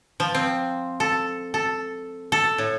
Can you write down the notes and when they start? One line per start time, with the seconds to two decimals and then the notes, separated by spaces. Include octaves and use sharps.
0.20 F3
0.35 C4
1.00 A4
1.54 A4
2.32 A4
2.58 A2